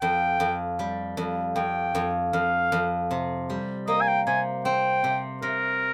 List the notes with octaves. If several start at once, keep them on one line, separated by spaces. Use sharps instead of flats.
F2 G5
F2
G3
F2
F2 G5
F2
F2 F5
F2
C3
G3
A#3 D#5
G#5
G5
C3 G#5
C4 G5
C3
C3 A#4